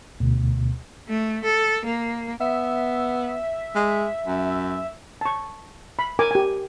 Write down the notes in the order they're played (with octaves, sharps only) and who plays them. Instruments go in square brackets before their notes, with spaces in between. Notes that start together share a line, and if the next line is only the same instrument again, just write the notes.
[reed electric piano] D2 B2
[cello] A3
A4
A#3
[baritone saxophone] B3 [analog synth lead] E5
[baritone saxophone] G#3
F#2
[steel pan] A5 C#6
B5
A#4 G#5 D6
G4 G#5